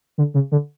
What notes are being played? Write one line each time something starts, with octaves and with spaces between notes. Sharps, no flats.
D3
C#3
D3